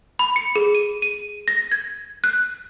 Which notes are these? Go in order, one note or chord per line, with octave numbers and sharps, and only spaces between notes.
B5
C#7
G#4
D#7
D#7
A#6
G#6
F#6